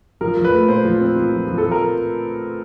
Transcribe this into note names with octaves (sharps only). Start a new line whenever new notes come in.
F3 A#4
F3
B4
A3
A#2 C5
F3
C4
F3
F3
F3
A4
F3
A#4